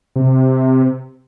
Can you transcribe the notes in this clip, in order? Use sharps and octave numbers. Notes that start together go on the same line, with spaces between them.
C3